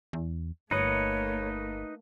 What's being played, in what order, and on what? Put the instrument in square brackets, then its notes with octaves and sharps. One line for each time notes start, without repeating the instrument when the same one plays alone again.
[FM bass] E2
[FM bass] G1 [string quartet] A3 A#3 [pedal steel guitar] D#4 B4 D#5 [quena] C#5